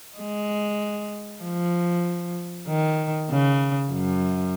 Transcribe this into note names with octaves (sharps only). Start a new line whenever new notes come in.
G#3
F3
D#3
C#3
F#2